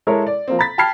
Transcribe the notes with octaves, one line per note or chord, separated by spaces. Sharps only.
G#3 E4 A4 A#4 C#5
D5
F3 A#3 C4
A#5 B5 A6 B6
G5 A5 B5 F6 G#6 C7